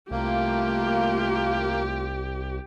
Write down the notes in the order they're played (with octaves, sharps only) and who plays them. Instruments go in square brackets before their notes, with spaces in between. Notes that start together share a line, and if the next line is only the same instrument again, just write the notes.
[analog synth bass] C2 [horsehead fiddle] A3 F4 [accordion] A#3 [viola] G4